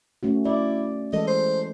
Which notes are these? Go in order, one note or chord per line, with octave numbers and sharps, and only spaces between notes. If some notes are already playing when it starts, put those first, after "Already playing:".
A3 C#4 F#4
E4 D5
E3 G#3 A4 D#5
C5